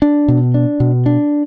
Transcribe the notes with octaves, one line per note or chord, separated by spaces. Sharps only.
D4
B2
D4
B2
D4